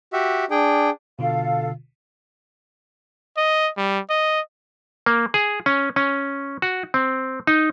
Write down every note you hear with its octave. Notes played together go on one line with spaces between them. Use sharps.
F#4 G4 E5
D4 G#4 G5
B2 D3 F4 A4 F5
D#5
G3
D#5
A#3
G#4
C#4
C#4
F#4
C4
D#4